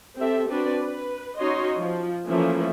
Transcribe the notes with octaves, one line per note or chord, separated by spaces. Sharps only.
C4 G4 A4 E5
C4 D4 F#4 B4 D5
B4
C#4 D#4 F#4 C#5 D#5 C6
F3
E3 F3 A3 A#3 C#4 E5